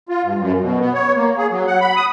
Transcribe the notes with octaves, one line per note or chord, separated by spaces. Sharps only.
F4
G2
F#2
B2
B3
C#5
A#3
G#4
F#3
F#5
B5
D#6